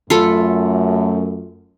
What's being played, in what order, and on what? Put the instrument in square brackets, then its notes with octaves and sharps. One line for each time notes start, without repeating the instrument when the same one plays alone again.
[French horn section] F#2 A3 [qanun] F4 A4 B5